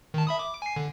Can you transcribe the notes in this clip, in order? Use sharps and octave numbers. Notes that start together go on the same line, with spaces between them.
D#3 A5
E5 B5 D#6
D6
G#5 C7
D3